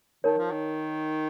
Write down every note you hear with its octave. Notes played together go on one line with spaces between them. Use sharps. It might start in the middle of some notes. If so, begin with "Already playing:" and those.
D#3 D#4 A#4 C#5
F3
D#3